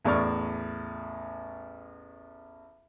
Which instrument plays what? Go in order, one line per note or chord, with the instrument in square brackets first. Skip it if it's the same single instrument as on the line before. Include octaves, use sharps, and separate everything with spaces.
[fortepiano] A1 E2 A2 D5 C#6 F6